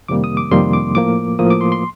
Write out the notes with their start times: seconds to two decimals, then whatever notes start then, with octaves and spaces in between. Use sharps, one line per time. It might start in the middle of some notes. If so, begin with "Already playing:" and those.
0.08 F2 C3 D#3 G3 A#3 D6
0.24 D#6
0.37 D6
0.51 F2 C3 D#3 G3 A#3 C6
0.73 D6
0.95 A2 F3 A#3 D6
1.39 A2 F3 A#3 D#6
1.50 D6
1.61 C6
1.72 C6